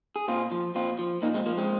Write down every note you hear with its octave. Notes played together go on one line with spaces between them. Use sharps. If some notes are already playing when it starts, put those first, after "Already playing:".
G#4
A#2 C4 F4
F3
A#2 C4 F4
F3
A#2 A#3 D#4
G#3 C4
F3 A#3
G#3 C4